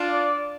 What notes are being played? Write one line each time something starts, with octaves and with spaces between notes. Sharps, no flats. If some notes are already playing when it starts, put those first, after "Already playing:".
Already playing: D4 F4
D5